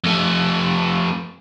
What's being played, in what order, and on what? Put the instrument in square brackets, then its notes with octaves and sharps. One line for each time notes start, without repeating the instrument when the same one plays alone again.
[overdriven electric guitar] F2 A3